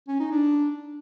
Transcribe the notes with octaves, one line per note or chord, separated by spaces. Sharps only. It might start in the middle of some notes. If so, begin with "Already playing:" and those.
C#4
D#4
D4